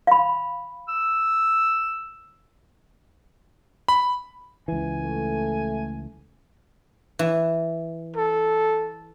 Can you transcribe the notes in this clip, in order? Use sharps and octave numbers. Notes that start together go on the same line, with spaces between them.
F5 B5
E6
B5
C#2 E3 G#5
A3
E3
A4